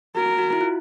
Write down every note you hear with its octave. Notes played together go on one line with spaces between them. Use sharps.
F#4 A#4
F#4
E4
F4